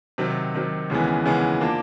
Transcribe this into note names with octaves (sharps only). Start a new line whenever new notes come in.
C3 D#3 F#3
C3 D#3 F#3
D#2 C#3 E3 G#3 B3
D#2 C#3 E3 G#3 B3
F3 A#3 D4